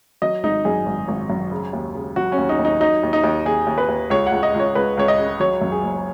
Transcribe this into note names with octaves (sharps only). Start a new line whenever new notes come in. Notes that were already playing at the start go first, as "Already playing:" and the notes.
F#3 D#5
G#1 D#4
F#2 G#4
G#1
G#1
F#2
C#3
D#2
C#3
F#3 F#4
C#4
D#2
D#4
D#2
D#4
F#3 D#4
D#2
D#4
D#2
D#2 G#4
D#2
B4
D#2
C#2 C#5
F#5
C#2
D#5
C#2
C#5
C#2 B4
C#2 C#5
D#5
C#3
F#3 C#5
F#2
G#4
F#1